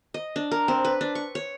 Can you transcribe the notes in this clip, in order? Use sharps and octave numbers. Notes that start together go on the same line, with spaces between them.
D#5
D4
A#4
C4
B4
D4
C#6
C#5